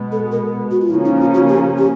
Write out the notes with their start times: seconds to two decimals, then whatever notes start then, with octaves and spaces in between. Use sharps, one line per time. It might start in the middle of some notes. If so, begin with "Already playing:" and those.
Already playing: B2 G#3 B3
0.12 A4
0.32 A#4
0.71 F#4
0.81 F4
0.90 C#3 F3 A#3 C#4 E4
1.05 D#4
1.20 F4
1.34 F#4
1.49 G4
1.78 G4